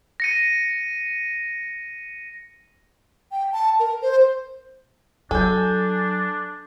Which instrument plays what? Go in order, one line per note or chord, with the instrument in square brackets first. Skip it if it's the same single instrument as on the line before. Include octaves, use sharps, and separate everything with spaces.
[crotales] A#6 C#7 D#7
[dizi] G5
A5
A#4
C5
[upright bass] F#3 [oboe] D4 [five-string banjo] A4 [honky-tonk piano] G#5 G6